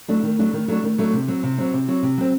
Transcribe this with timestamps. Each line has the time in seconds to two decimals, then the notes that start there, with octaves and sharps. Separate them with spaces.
0.08 F#3 A3 D4
0.23 D#3
0.39 F#3 A3 D4
0.53 D#3
0.68 F#3 A3 D4
0.83 D#3
0.98 F#3 A3 D4
1.13 C3
1.28 F#3 C4
1.43 C3
1.58 F#3 C4
1.73 C3
1.88 F#3 C4
2.03 C3
2.17 F#3 C4